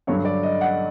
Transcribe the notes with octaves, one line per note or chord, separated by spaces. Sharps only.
G2 D3 F#3 C#5
D5
D#5
F#5